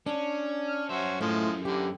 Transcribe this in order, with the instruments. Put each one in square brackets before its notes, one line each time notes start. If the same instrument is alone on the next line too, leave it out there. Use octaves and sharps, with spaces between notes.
[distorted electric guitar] C#4 [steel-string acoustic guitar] D4
[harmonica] F6
[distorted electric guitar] F#2 E5 [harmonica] C#4 F#4 C5
[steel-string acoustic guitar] A2 [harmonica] F3 G#3
[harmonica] D3 E3 A#3 [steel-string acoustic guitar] G4